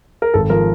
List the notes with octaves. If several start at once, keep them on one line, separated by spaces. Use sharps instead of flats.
A#4
G#1 A4
F3 A#4